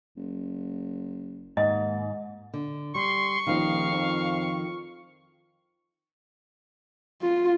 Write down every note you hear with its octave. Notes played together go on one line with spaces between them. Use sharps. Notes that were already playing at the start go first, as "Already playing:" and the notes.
F#1
D#2 G#2 D#5
D3
G3 C6 C#6
D#1 D#3 F3 F4 F5
F2
F4